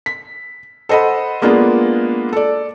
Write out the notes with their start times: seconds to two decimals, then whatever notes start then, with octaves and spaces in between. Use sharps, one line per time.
0.06 B6
0.89 A4 C5 D#5 F#5 B5
1.42 G#3 A#3 B3 D4 F4 G#4
2.33 A4 D5